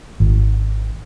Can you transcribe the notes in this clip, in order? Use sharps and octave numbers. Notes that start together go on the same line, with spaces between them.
G#1